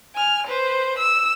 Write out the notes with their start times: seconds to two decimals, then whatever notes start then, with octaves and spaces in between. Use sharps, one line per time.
0.15 G#5 F6
0.47 B4 C5
0.98 E6